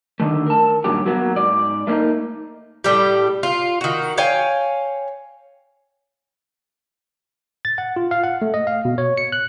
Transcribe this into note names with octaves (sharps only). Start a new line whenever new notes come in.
D3 D#3 A3
A#4 A5
G2 A#2 D#3 F#3 G4
F#3 A#3 B3
G#2 D5
A3 A#3 C#4 D#4
A2 G3 G4
F4
D#3 F#4
C#5 F5 G5 G#5
A6
F#5
F4
F5
F#5
A3
D#5
F5
B2
C#5
C#7
F#6